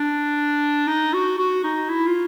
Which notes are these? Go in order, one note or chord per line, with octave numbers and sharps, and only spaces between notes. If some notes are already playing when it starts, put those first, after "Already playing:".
Already playing: D4
D#4
F#4
F#4
D#4
E4
F4